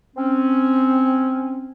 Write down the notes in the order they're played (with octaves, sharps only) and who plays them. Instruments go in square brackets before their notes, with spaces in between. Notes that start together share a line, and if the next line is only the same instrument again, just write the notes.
[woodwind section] C4 C#4